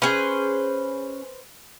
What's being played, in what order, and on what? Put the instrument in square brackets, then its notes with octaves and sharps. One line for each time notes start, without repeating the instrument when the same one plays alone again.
[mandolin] C#4 G#4 [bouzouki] B4 C5